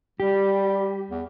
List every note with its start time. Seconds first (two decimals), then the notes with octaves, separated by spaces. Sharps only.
0.20 G3 G4
1.10 E2